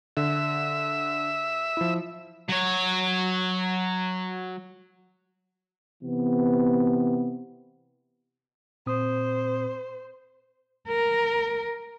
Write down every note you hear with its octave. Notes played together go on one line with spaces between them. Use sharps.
D3 E5
F3 E4
F#3 C#5
C3 E3 B3
A#2 C4 C5 D#6
A#4